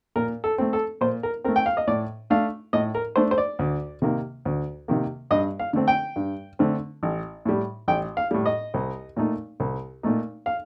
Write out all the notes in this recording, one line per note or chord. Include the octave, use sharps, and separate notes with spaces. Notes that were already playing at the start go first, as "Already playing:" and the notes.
A#2 A#4
A4
A3 C4
A4
A#2 C5
A#4
A3 C4 A#4
G5
F5
D#5
A2 D5
A3 D4 F5
A2 D#5
A#4
A3 D4 C5
C5
D5
D2
C3 D#3 A#3
D2
C3 D#3 A#3
G2 D#5
F5
D3 A3 C4
G5
G2
D3 A3 C4
A1
A2 G3
A1 G5
F5
A2 G3
D#5
C2
A#2 A3 D#4
C2
A#2 A3 D#4
F5